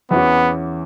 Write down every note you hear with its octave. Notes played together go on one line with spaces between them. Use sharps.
E2 E3 B3 C#4 F#4